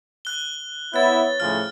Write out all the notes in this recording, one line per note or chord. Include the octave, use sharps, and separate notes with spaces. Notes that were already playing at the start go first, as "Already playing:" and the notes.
F#6 G7
B3 E4 C#5 F#6 A6
A2 C#3 F3 F6